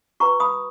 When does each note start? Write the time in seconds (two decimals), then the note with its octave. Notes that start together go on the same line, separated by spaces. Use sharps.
0.20 F#4 B4 A#5 C#6
0.40 B5 D#6